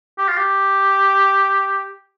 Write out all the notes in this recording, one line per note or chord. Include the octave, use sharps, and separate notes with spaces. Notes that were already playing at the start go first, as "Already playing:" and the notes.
G4
F4
G4